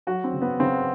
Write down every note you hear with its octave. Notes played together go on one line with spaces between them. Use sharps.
F#3 F#4
C4
C#3
B3
C#3 C4